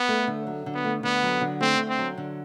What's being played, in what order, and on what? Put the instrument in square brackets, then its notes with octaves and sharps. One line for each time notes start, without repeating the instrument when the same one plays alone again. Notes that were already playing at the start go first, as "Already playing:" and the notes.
Already playing: [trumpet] B3
[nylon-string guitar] A3
D3
F#3
D3
[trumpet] B3
[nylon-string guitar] A3
[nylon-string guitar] D3 [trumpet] B3
[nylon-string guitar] F#3
D3
[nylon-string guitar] A3 [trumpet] C4
[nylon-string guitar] D3
[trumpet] C4
[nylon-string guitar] F#3
D3